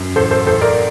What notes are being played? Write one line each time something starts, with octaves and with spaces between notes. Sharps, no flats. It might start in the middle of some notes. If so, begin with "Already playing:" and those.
Already playing: F#2
A1 A4 C5
A4 C5
A1 A4 C5
A#4 D5